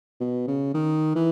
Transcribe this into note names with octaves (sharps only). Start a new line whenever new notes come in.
B2
C#3
D#3
E3